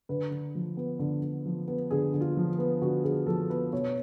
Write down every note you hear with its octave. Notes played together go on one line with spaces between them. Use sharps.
D3 B4
D3
F3
B3
D3
D3
F3
B3
D3 G#4
D3
F4
F3
B3
D3 F#4
D3 G#4
F3 A4
B3 B4
B2 C#5